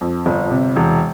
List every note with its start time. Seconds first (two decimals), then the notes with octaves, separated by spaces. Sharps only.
0.01 F2
0.26 G1
0.51 C3
0.76 E1